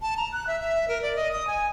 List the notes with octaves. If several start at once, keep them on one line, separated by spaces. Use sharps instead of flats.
A5
A#5
F#6
E5
E5
A#4
D5
D#5
D#6
G#5